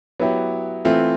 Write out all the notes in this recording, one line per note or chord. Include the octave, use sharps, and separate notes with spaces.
F#3 B3 E4 G4
E3 A3 C4 F4